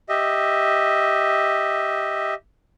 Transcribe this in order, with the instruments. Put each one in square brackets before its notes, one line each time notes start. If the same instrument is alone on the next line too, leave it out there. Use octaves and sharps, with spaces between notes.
[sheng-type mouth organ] G4 D#5 E5